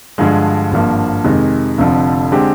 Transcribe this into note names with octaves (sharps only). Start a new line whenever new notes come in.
G2 D3 F3 G#3
G#1 G2 F3 A#3
F2 C3 D#3 G#3
F1 F2 D3 F3
D3 G#3 C4 G4